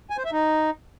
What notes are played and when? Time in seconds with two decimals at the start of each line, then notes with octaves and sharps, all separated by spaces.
0.10 G#5
0.18 C5
0.25 E5
0.32 D#4